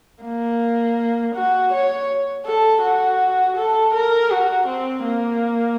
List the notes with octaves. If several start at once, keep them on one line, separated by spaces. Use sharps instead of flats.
A#3
F#4
C#5
A4
F#4
A4
A#4
F#4
C4
A#3